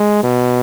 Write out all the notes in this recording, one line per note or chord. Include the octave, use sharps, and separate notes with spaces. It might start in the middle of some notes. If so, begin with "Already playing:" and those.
Already playing: G#3
B2